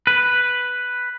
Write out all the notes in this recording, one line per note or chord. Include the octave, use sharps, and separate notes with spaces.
B4